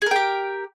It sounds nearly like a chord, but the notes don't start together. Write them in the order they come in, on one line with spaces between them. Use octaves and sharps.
G#4 A#4 G5 G4